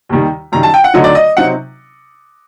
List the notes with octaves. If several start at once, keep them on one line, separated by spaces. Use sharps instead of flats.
D#2 D#3 G3
F#2 D#3 G3 A#5
A5
G5
F#5
D2 D3 F#3 A3 D#4 D#5
D5
D#5
C3 F#3 C4 D#4 F#5